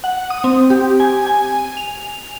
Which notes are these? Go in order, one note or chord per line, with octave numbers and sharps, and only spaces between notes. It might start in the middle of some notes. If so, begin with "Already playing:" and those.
F#5
D#6
C4
G4
G#5
G#5
F7